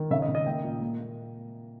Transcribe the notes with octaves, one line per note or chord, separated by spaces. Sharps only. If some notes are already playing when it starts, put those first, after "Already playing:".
Already playing: D#3
C#3 E5
D#5
C#3
D#5
A#3 G5
A#2
A#3
A#3